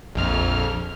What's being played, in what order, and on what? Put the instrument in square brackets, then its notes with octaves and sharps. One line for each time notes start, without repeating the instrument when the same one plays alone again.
[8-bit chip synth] A#1 F2 F6